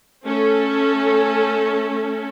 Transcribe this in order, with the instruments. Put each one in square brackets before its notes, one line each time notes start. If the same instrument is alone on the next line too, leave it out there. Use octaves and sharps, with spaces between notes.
[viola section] A3 C#4 A4